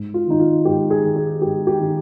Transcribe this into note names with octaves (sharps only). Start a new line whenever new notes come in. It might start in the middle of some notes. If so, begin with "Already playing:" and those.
Already playing: G#2
F4
D#3 D#4
F4
G#2 G4
G#4
D#3
G#4
G#2 G4
G4
D#3